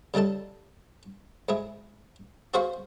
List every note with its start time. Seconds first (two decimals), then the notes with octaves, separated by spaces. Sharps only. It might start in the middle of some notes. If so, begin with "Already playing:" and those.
0.14 C#3 G3 D#4 A4 A5
1.49 G#2 E4 G#4
2.54 F#4 G#4 C5 F5 B5 C#6